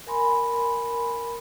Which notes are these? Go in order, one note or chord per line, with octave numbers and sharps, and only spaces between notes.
A#4 G#5 B5 C6